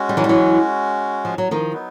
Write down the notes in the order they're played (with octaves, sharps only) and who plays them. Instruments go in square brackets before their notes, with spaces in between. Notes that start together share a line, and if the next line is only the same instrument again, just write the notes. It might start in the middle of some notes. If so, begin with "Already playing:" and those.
Already playing: [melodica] G#3 C#4 F#4
[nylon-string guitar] G3
E3 F#3
G3
E3 F#3
F3
F#3
D#3 F3
[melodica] F#3 B3 D#4